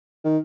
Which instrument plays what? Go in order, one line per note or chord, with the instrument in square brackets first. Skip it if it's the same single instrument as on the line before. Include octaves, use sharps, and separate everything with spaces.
[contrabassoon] D#3